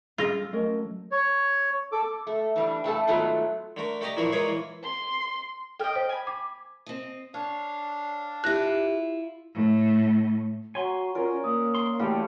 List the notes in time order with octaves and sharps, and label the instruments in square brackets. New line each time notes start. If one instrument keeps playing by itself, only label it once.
[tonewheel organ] G3 [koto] F4 [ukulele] G#4 [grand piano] E6 A#6
[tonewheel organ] F#3 A3 [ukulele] C#4 A#4 D#5
[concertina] C#5
A4 D6
[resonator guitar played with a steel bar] A3
E3 G3 D4
G2 A3 A4 A5
G#2 D#3 F#3 A3 B3 F4
[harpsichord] D3 A3 A#4
A3 G4 D5 D#5 A5 A#5
A#2 E3 F3 D4 E4 F#4
G#3 A#3 F4 A#4 B4 C#5
E3
[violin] C6
[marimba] A4 F6 [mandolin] D#5 G5
[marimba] C5
[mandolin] G#5 B5
[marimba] D6
[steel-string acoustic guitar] C4 D#5
[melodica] D4 F5 [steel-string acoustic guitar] C#5
[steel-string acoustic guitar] E4 F4 [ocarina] G4 [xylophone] F#6 A#6
[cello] A2
[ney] F#4 [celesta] C#5 F#5 A#5 [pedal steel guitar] G#5 C6
[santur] C#4 A#4 D5 [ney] F4
[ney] A#3 [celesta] D#6 E6
[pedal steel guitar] C6
[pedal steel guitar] E3 A3 F#4 [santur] G3 A4 G5 [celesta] F5